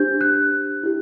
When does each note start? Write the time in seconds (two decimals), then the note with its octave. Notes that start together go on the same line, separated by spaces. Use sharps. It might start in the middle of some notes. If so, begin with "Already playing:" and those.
Already playing: D4 G4 C5 G6
0.21 F#6
0.83 E4 G4